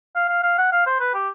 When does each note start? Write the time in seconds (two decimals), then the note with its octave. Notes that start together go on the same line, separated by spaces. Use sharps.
0.16 F5
0.29 F5
0.43 F5
0.58 F#5
0.72 F5
0.86 C5
1.00 B4
1.14 G4